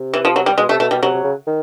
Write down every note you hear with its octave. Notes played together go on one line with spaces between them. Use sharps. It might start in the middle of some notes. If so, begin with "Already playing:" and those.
Already playing: C3
E3
F3
F#3
G3
B2 G#3
C3 A3
B2 A3
B2 G3
C3 F#3
C3
C#3
D#3